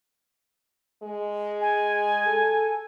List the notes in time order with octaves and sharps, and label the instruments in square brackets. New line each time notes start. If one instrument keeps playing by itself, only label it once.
[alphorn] G#3
[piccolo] G#5
[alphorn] A4